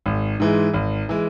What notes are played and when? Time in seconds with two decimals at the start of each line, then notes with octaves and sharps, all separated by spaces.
0.06 G#1
0.40 G#2 E3 G#3
0.74 G#1
1.09 E3 G#3